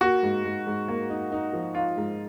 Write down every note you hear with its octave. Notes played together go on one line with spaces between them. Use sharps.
A#3 F#4
G#2
G#2
G#2
A#3
D#4
D#4
F3
D#4 F4
G#2